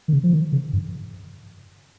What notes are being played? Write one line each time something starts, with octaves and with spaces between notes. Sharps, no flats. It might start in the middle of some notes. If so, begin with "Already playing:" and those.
D#3
C#3
F3
D#3
C#3
G2